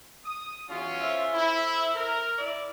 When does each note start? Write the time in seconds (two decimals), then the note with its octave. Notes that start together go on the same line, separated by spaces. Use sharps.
0.25 D#6
0.69 E2 F#3 C#4 F4
1.01 A4 C5 E5
1.34 E4
1.96 A#4
2.38 E4 D5